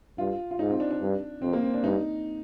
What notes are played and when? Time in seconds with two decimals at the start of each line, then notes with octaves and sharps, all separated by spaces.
0.18 G2 F4
0.51 F4
0.59 G#2 D#4
0.70 C4
0.80 D4
0.91 D4
1.01 G2
1.42 F2 C4
1.53 A#3
1.63 C4
1.74 D4
1.84 G2 D#4